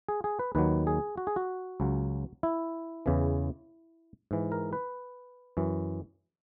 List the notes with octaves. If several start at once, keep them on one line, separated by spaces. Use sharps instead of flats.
G#4
G#4
B4
D#2 D#3 F#3 B4
G#4
F#4
G#4
F#4
C#2 C#3 F#3
E4
E2 C#3 E3
G#2 E3
A#4
B4
F#2 E3